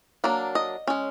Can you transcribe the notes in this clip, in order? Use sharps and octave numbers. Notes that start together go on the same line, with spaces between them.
F#3 A#3 D4
D#5
G#3 C#4